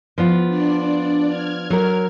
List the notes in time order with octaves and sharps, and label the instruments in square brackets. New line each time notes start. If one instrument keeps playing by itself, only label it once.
[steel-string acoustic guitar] F3 B3 F4
[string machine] D4 D5
F6 G#6
[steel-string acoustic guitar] F#3 A#4